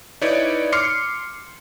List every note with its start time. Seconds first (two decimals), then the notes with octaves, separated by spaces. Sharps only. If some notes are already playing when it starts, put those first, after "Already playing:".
0.21 D#4 E4 B4 C#5 D5
0.72 C6 D6 F6 C7 C#7